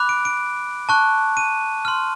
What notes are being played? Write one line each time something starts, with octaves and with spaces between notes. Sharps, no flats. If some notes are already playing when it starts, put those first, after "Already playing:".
Already playing: B5 D6 F#6
D7
D7
A5 C#6 F#6
D#7
C6 F6